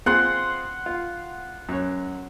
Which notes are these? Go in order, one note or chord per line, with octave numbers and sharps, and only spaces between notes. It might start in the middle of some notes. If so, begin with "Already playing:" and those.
C4 F4 G#4 F#5 C6
F4
F#2 C#5